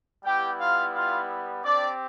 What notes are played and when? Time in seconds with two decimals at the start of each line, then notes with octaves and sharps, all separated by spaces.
0.24 G3 B3 E4 G4 G5
0.59 F4 F5
0.94 F4 F5
1.64 C4 D4 G4 D5